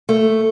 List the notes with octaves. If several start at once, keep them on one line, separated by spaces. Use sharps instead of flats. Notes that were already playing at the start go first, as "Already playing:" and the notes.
A3